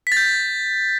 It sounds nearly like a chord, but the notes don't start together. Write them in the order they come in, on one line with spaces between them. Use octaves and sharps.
B6 A6 G6